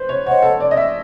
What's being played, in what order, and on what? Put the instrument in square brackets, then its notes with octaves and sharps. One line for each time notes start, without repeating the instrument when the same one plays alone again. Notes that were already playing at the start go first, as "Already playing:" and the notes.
Already playing: [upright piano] B4 C5
C#5
[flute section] C5 D#5 F#5 [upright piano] C#5
[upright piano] A4
D5
D#5
E5